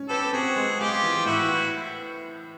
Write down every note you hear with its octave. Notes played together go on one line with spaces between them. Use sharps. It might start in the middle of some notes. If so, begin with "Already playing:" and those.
Already playing: C#4
G4 A4 B4
C4 F#4 G#4
G#3
G#3 F4 G4
E3
A2 E4 F#4